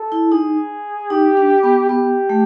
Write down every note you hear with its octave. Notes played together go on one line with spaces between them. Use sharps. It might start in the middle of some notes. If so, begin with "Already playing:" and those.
Already playing: A4
E4
D#4 G#4
D#4 G4
D4
B3
B3 G4
A3